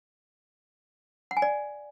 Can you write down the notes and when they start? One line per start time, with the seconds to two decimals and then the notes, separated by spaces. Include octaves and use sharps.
1.31 F#5
1.37 G#5
1.42 D5